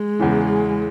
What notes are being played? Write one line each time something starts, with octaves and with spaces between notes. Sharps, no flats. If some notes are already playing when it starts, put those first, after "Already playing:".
Already playing: G#3
E2 C#3 E3